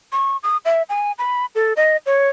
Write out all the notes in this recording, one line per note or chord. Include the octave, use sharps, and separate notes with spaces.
C#6
D#6
E5
G#5
B5
A4
D#5
C#5